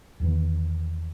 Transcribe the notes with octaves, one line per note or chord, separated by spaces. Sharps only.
E2 D#3 E3